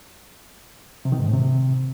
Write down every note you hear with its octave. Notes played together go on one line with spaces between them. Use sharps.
C3
D#3
G#2
A2
C3